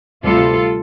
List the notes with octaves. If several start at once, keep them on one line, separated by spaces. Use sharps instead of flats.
D2 C3 G3 F4 A4